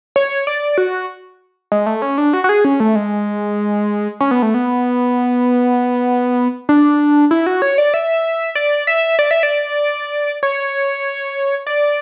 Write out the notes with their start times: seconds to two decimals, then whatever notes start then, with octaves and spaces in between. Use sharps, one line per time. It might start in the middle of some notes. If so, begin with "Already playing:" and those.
0.16 C#5
0.47 D5
0.78 F#4
1.72 G#3
1.86 A3
2.02 C#4
2.18 D4
2.33 F#4
2.44 F#4
2.49 G#4
2.65 C#4
2.80 A3
2.96 G#3
4.21 C#4
4.31 B3
4.42 A3
4.54 B3
6.69 D4
7.31 E4
7.46 F#4
7.62 C#5
7.78 D5
7.94 E5
8.55 D5
8.87 E5
9.19 D5
9.31 E5
9.43 D5
10.43 C#5
11.67 D5